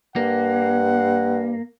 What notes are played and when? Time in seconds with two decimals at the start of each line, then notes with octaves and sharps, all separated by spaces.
0.16 G2 A#3 F#5